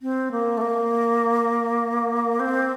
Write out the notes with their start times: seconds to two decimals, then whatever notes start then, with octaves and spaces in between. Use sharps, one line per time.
0.02 C4
0.32 A#3
0.58 A3
0.62 A#3
2.40 C4